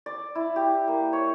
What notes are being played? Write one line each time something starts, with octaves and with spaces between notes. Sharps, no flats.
D5
E4
G4
A#3
C#5